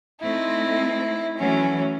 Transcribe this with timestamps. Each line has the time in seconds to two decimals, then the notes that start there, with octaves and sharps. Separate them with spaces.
0.21 A3 C4 D#4 E4
1.38 E3 F#3 A3 C#4